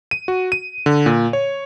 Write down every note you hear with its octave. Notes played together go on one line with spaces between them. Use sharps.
D#7
F#4
D#7
D3
A#2
C#5